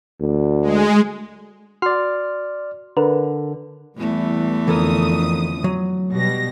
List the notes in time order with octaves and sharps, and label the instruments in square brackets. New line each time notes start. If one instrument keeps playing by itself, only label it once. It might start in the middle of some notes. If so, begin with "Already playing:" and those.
[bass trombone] D2
[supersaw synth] G#3
[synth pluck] F#4 C6 [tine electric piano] D5 F6
[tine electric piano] D3 [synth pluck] A#4 B4
[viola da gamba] E2 A3 [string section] E3 G3
[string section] F2 D3 D#6 [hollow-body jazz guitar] E3 A4 A#4
[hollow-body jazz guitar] F#3
[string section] B2 G3 A#6